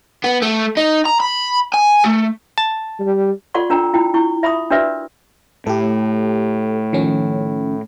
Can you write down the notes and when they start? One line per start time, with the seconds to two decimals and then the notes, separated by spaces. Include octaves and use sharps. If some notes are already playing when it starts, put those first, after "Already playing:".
0.24 B3
0.42 A3
0.77 D#4
1.05 A#5
1.20 B5
1.74 G#5
2.04 A3
2.58 A5
3.00 G3
3.54 F4 A4 D5 F#5 C6 C#6
3.70 D4 F4 A#4 G5 A#5
3.93 E4 F4 G5
4.14 E4 C#6
4.43 E5 B5 C#6 D#6
4.70 D4 F#4 A#4 B4 D5 E5
5.67 A2 G4 A4
6.93 D#3 F3 C#4